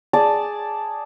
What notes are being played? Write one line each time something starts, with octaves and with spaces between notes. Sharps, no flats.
G#4 D5 A5